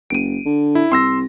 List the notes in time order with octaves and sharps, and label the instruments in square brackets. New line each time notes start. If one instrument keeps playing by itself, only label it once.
[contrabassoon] F#1 [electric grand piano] D7 D#7
[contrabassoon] D3
[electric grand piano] E4
[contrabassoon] C2 [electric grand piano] C6 E6 A#6